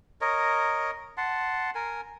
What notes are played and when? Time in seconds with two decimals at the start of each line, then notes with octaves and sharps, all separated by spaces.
0.21 A#4 C#5 D#5
1.17 F#5 A5 C6
1.75 A#4 G#5